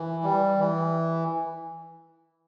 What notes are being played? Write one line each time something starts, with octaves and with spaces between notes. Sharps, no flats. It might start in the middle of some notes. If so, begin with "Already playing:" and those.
Already playing: E3
G3
E3